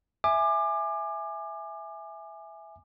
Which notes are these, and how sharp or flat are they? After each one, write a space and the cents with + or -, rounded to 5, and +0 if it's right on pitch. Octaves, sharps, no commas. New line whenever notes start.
E5 +0 G#5 +0 D6 +30